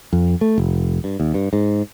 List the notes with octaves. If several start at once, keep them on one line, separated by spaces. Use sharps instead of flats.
F2
A3
F1
G2
D#2
G2
G#2